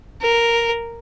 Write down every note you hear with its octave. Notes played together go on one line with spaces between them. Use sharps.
A#4